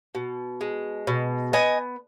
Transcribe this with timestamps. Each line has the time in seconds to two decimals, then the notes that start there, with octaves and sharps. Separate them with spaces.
0.15 B2
0.61 G#3
1.07 B2
1.53 B3 D#5 G#5